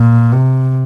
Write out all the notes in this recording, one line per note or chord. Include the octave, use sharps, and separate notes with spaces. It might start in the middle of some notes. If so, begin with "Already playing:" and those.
Already playing: A#2
C3